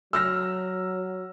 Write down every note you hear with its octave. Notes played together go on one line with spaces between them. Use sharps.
F#3 E6 F6 A#6